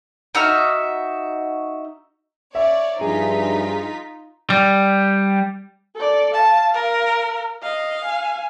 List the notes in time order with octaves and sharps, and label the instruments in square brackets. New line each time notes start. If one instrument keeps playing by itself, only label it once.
[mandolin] D#4 F#4 E5 F6
[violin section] C#5 D5 [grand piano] E5
[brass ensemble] G2 F3 [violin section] D#4 F4 B6 [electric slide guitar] G#4
[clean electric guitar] G3
[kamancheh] A4 D5
[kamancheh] F5 [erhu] A5
[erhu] A#4
[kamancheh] D#5 [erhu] F5
[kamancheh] G#5